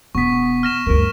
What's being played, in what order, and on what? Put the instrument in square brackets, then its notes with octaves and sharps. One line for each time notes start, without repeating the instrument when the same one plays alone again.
[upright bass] E1 [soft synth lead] B3 [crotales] C#6 B6
[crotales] F6 A#6 E7
[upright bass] D2 G2 [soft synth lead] A#4